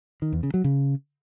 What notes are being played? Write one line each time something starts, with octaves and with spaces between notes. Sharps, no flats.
D#3
E2
C#3
F#3
C#3